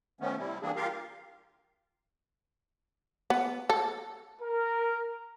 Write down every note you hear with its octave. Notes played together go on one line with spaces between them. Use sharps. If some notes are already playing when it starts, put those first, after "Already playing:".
D#3 F3 A3 B3 C#4
C3 G3 C4 E4
E3 G3 A#3 C4 D4 G#4
F4 G4 A#4 F5
B3
A4
A#4